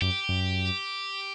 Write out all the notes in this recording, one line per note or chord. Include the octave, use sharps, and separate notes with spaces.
F#2 G4
F#2